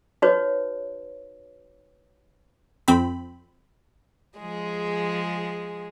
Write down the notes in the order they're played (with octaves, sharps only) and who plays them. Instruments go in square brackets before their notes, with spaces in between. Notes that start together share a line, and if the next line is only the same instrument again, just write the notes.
[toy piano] D#4 F#4 B4 C#5
[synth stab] F2 C4 B5
[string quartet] F3 G#3 G#4